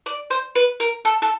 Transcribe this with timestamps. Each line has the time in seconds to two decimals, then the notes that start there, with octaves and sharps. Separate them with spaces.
0.06 D5
0.30 C5
0.55 B4
0.80 A#4
1.05 A4
1.22 A4